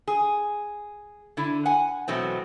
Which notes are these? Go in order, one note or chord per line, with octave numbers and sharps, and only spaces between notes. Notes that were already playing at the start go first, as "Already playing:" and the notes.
G#4
D3 E4
F#5 G#5
B2 E3 F#3 A3 C4